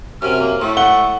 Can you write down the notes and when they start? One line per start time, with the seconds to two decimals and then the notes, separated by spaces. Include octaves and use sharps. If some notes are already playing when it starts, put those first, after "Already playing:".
0.22 F#2 C3 F6
0.40 A#3
0.62 A2 E5 C#6
0.77 F#5 G7